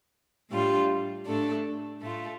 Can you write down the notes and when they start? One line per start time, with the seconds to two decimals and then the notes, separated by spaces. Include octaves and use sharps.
0.50 A2 G3 D4 F4
1.25 A2 A3 D4 A4
2.00 A2 A3 F4